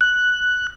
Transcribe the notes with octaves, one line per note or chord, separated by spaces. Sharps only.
F#6